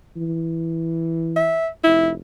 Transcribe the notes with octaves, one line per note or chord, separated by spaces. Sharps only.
E3
E5
F1 E4